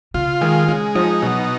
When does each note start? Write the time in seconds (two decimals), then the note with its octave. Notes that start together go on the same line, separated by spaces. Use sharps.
0.14 C#3 F4
0.41 D#3 G#3
0.68 C#3 G#3
0.95 F3 D#4
1.22 B2 F#3